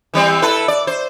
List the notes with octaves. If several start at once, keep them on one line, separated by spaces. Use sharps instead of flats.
E3 G3 C4
E4 A4 B4
D5
C5